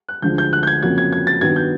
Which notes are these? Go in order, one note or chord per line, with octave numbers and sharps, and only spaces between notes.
F#6
D2 D3 F3 G#3 G6
G6
F#6
G6
G#6
F2 C#3 F#3 A#3 G#6
G#6
G#6
A6
G2 D#3 F#3 B3 G#6
G6